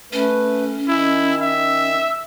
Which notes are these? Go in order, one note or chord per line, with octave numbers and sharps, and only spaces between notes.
A3 C#4 B4
D#3 E4
E5